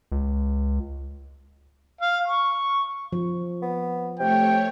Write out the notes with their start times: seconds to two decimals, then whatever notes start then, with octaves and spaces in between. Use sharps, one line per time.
0.12 C#2
2.01 F5
2.28 C#6
3.13 F3
3.62 B3
4.20 C3 A3 C#5 G5